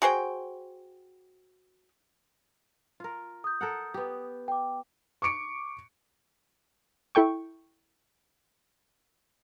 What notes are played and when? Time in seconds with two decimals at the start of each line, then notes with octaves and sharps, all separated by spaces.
0.02 F#4 G#4 C5 G5
3.00 F4 A#4
3.44 D#6 G6
3.61 A4 A#4 F#5
3.94 B3 G4
4.48 G5 D6
5.22 C#6 D6 C#7 D7
7.15 E4 A4 G5 C#6